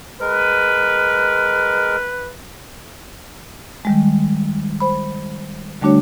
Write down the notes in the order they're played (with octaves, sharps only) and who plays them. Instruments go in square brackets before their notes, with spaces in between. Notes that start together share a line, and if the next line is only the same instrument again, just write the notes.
[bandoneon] G#3 A#4 [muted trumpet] B4
[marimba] D#3 G3 G#3
C5 B5
D3 G3 A3 D4 F#4 C#5